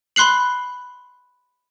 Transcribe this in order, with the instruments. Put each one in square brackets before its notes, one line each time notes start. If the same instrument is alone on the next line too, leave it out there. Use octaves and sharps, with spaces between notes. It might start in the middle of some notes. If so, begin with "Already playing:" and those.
[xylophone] B5 C6 F#6 C7 F#7